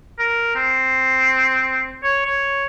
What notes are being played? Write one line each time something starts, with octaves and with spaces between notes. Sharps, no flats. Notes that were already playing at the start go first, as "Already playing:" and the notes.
A#4
C4
C#5
C#5